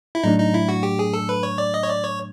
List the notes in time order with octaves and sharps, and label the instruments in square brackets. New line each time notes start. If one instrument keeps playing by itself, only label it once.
[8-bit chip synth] E4
[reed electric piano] A2 F#3 A3 D4 [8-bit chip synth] D#4
[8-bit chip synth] D#4
E4
F#4
G4
G#4
A4
B4
C#5
D5
D#5
C#5
D5
C#5